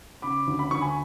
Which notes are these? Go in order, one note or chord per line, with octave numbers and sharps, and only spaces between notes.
C#3 B5 D6
D2
B5
D2 C#6
G#5 B5